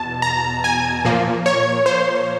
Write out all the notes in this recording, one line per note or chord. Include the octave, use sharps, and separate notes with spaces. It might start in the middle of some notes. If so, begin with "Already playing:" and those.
Already playing: E2 B2 A5
A#5
G#5
A#2 F3 A#3
C#5
C5